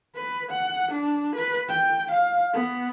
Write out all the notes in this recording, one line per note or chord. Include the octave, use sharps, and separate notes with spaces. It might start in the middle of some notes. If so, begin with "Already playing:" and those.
B4
F#5
D4
B4
G5
F5
B3